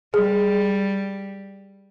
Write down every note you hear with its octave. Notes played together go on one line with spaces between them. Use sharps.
G3 G#4